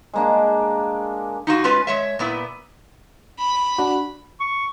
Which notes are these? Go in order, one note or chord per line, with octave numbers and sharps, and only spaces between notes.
G#3 A#3 D4
D#4 F4 F#4
G#3 C#4 F4 B4
G#3 C#5 E5
A#2 B3 E4
B5
D4 F#4
C#6